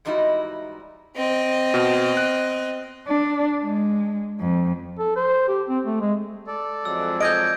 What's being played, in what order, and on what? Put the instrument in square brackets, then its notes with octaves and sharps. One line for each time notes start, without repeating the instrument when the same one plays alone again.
[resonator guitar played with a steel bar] E2 G#2 G3 D#4 E4 F#4
[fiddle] C4 D#5
[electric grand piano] B2
F#6
[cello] D4
G#3
F2
[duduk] A4
C5
G4
C4
A3
G#3
[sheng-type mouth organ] A4 D5
[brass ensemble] F2 F#3 G#3 [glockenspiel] E6
[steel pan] D#5 [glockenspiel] G6 G#6 D7